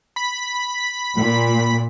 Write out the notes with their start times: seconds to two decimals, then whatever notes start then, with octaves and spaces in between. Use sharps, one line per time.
0.16 B5 B6
1.16 A#2